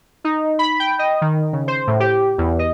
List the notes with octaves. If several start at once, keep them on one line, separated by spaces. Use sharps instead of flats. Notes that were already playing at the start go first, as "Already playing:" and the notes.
D#4
B5
G5
D#5
D#3
C#3
C5
A2
G4
E2
D#5